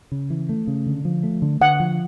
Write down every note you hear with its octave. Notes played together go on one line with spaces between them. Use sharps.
C#3
E3
A3
C#3
D3
F3
A3
D3
D3 F#5
F3